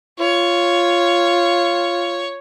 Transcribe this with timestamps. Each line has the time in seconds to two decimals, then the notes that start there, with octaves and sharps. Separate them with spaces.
0.20 F4 C#5